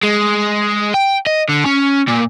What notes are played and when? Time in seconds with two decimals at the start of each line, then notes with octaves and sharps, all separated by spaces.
0.03 G#3
0.94 G5
1.27 D#5
1.49 D3
1.66 C#4
2.08 A#2